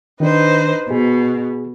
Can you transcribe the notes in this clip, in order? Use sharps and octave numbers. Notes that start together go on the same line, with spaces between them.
D#3 D4 D#4 B4 C5
B2 G#4